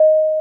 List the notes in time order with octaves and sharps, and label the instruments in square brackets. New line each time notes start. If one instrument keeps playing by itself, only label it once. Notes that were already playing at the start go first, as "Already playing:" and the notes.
Already playing: [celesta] D#5